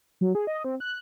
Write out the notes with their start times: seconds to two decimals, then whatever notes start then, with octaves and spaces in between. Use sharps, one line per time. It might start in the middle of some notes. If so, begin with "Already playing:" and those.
0.21 F#3
0.35 G#4
0.47 D#5
0.65 C4
0.80 F#6